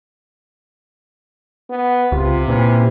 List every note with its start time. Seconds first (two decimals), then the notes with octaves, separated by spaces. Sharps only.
1.70 B3
2.12 C#2 C3 F4
2.48 A#2 E3 G3 C#4